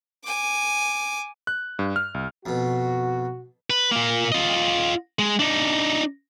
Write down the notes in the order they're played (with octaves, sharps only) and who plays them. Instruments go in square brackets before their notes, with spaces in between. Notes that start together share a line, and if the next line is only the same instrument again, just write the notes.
[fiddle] G#5 D6
[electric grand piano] F#6
G2
F6
C2
[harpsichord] F2 B2 [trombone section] F#4
[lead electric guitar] B4
A#2 A#3
F4 D#5
G#3
D4 D#4